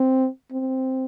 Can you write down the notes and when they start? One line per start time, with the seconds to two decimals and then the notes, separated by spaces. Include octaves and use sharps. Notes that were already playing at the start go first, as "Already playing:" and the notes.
Already playing: C4
0.52 C4